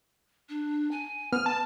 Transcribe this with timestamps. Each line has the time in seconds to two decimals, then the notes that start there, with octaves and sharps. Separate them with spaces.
0.49 D4
0.91 G#5
1.32 B3 F6
1.46 A5